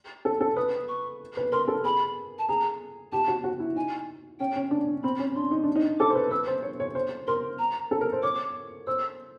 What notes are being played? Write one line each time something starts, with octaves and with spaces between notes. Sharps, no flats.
A4
A4
B4 D#6
C#6
B4
A#4 C6
A4
G#4 B5
A5
G#4 A#5
G4 A5
F#4
F#4
E4
D#4 G#5
C#4 G5
C#4
D4
D4
C4 B5
C#4
D4 C6
D#4
D4
D#4
A4 D6
C5
B4
B4 E6
C5
C#5
C#5
C5
A#4 C6
A#5
A4
A#4
C5
C#5 D6
C5 E6